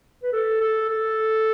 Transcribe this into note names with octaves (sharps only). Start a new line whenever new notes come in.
B4
A4
A4
A4